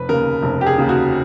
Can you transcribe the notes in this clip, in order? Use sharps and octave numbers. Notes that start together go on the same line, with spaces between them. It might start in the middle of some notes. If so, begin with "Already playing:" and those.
Already playing: F1 B4
D#2 C#3 A#4
F1
G4
G#4
D#2 C#3
F#4